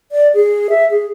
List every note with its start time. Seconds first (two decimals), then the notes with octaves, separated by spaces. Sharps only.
0.12 D5
0.34 G#4
0.70 E5
0.90 G#4